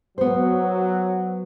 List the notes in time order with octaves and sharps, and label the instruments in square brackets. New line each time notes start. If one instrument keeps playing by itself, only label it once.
[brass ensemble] F#3 [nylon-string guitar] B3 C5